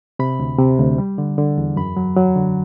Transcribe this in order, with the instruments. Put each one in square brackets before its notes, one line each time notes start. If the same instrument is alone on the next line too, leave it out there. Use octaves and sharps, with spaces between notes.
[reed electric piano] C3 B5
D2
C3
D2
G3
D3
D3
E2
F#2 B5
F#3
F#3
D3